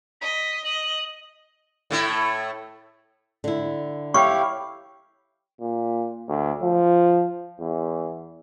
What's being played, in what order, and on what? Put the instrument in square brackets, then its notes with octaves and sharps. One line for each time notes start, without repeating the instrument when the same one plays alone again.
[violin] D#5 [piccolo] B6
[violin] D#5 [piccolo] F#7
[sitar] A2 A3 E4
[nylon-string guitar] D3 E4
[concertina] E4 G4 F5 [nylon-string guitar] C#5 [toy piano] G5 C#6
[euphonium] A#2
D2
F3
E2